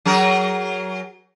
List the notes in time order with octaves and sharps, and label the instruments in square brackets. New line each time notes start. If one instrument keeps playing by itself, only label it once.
[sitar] F#3 G#4 A#4